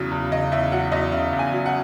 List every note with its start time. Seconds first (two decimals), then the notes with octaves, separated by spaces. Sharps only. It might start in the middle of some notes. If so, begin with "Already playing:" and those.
Already playing: E2 C#3 F#3
0.11 E2
0.32 C#3 D#5
0.52 E2 E5
0.72 F#3 F#5
0.92 E2 D#5
1.12 C#3 E5
1.33 E2
1.39 G#5
1.53 F#3
1.66 F#5